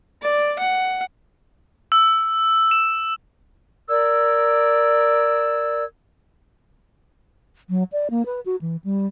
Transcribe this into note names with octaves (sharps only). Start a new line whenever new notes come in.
D5
F#5
E6
E7
A#4 D5 E6 G#6
F#3
D5
A#3
B4
F#4
E3
G3